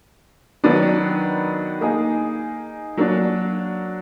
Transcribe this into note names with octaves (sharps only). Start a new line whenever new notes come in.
D#3 F#3 B3 D4
A#3 D#4 G#4
F#3 A#3 D4